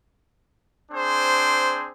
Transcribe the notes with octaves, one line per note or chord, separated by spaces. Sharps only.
C4 D4 G#4 C5